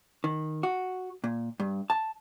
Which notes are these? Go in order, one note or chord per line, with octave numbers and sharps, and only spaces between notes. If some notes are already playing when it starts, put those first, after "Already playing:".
D#3
F#4
A#2
G2
A5